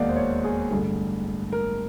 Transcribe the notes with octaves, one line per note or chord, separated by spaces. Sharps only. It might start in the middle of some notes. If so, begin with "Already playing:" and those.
Already playing: E1 D#2 D#3 D5 F5 F#5
C5
C#5
G#4
A1 G2 D3
A#4